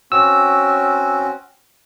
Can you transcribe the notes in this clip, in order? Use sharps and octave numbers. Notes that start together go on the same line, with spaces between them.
C4 C#4 F#4 E6